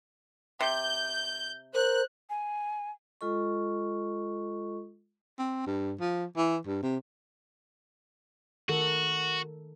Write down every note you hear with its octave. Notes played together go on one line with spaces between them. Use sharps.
C3 G6
A#4 C5 F#6
G#5
G#3 F4 A4 D#5 C#6
C4
G2
F3
E3
G2
C3
D#3 F#4 A4 A#4